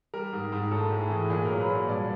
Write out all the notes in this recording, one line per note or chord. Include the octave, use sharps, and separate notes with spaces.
G3 A#4
G#2
G#2
A2 A4
A2
G#4
E3
A#2 G#4
A#4
F#3
B4
A#2
C#5
G2 D5